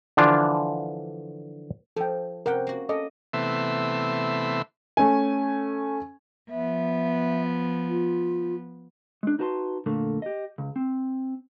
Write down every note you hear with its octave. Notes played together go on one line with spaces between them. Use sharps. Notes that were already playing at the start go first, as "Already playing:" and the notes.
D3 E3 F3 D4 F4
F3 A4 G5
C3 C#4 A#4 F#5 G5
A#3 F#4
C#4 A4 D#5 D6
C3 E3 A3 B3 E5 C6
A3 C#4 G#5
F3 B3 E5
F4
G#3 D4
D#4 F#4 B4 A5 B5 C6
F2 A#2 D3 A3 A#3
G4 D#5
C#2
C4